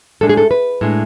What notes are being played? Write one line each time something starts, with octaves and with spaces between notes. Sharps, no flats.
A2 G#3 D4 A4
G#4
A4
B4
A2 G#3 D4